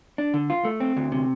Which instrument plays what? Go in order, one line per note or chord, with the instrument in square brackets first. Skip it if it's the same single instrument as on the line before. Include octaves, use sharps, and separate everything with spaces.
[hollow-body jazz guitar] D4
D3
F4
A3
C4
D2
C3